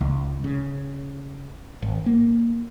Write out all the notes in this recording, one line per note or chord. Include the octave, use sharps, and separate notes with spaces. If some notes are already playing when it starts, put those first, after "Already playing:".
C#2
C#3
G#1
A#3